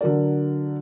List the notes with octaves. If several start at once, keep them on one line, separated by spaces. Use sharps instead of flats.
D3 F#3 A#4 D5